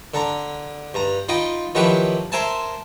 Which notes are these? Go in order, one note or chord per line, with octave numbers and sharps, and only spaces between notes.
D3 D4 A#5
G2 A#5
D#4 F4 D#5 G5 B5
D#3 F3 F#3 E4 G4 B4
A#4 C5 E5 G#5 A5